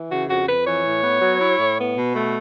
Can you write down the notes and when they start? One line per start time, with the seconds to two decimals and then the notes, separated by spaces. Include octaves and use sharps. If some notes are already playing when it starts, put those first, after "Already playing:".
Already playing: E3
0.10 C#3 F#4
0.27 F2 F#4
0.46 F2 B4
0.65 E3 C#5
0.84 A2
1.03 B3
1.21 F#3
1.39 E4
1.59 A2
1.78 B3
1.96 B2
2.14 A3